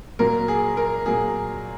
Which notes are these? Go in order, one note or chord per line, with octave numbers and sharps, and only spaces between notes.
A#2 F#3 A#3 A#4
G#4
A#4
A#2 F#3 A#3 G#4